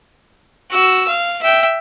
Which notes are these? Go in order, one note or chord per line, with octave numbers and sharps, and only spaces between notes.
F#4 E6
F5
E5 G5